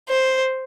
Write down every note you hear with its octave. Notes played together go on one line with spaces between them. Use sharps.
C5